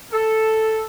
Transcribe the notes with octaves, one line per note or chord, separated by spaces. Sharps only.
A4